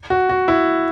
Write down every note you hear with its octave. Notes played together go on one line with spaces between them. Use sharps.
F#4
F#4
E4